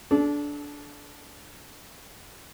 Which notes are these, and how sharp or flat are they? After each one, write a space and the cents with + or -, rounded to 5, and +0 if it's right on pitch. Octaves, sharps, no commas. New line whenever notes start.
D4 -15 A4 -35